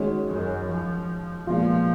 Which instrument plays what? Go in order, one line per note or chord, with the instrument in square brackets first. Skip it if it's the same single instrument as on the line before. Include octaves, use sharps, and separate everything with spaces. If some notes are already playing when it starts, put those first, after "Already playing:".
Already playing: [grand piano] D#3 G#3 C#4 F#4
[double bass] F#2
F3
[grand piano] A#2 G#3 B3 F4 [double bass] F3